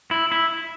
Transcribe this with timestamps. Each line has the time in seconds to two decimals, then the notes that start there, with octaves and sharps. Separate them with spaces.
0.11 E4
0.32 E4